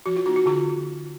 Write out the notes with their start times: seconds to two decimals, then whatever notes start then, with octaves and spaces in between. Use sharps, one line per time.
0.06 F3 F#4
0.16 F4
0.26 B3 D#4 F#4
0.36 F#4
0.46 D3 F4